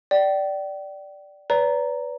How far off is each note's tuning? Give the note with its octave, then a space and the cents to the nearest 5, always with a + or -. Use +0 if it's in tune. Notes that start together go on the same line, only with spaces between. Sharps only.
D5 +0 G5 -35
B4 +0 D5 -40 A#5 +0